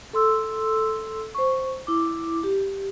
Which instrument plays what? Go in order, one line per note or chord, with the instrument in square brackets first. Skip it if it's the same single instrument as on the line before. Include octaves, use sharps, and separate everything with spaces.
[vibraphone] A4 C6 E6
C5 C#6
E4 D6
G4